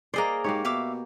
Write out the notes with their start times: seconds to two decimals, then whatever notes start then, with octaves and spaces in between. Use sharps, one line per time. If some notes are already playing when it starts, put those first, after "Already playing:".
0.14 A#3 G#4 C5 D5 D#5 A#5
0.44 G#2 A#3 G4 C#5
0.65 B2 E5 F5 D6